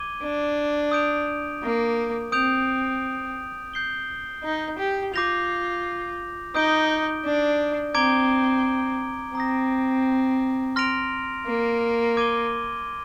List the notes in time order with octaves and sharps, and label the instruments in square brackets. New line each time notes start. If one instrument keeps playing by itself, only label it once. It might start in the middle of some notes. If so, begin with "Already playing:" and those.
Already playing: [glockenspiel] D6 G#6 D#7 G7
[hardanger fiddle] D4
[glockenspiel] D#6 G6 D7 F7
[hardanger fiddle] A#3
[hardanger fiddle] C4 [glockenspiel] D#6 G6 D7 F7
[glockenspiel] G6 C7 G7
[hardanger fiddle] D#4
G4
[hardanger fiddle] F4 [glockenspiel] D6 G6 A#6 F7
[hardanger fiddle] D#4 [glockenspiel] D#6 G6 D7 G7
[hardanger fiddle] D4
[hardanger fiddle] C4 [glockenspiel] A#5 D6 G#6 D7 G7
[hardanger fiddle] C4 [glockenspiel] A#5 D#6 A#6
[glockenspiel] C6 F6 A#6 D7 F7
[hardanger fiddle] A#3
[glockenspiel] D6 G#6 D#7 G7